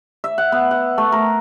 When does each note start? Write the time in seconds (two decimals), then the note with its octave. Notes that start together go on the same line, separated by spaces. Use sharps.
0.24 E5
0.38 F#5
0.52 B3
0.71 F#5
0.98 A3
1.12 A#4